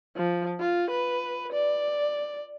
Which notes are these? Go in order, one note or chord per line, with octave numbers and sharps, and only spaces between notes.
F3
F4
B4
D5